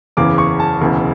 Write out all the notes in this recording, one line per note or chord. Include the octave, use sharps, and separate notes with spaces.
F#1 E2 C#3 E3 D6
C#6
A5
E1 D2 C#3 E3